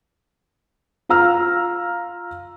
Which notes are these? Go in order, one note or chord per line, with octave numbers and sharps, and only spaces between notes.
F4 F5 A#5 E6 F6